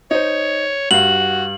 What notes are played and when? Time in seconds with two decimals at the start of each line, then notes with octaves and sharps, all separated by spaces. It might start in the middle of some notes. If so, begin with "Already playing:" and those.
0.11 D#4 C5 C#5
0.91 G2 F#4 F5 F#7